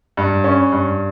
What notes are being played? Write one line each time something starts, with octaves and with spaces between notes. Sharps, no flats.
G2
C#4
G2